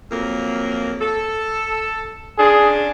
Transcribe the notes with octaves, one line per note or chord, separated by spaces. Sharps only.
F2 F#3 A#3
A4
C#3 F3 D4 G#4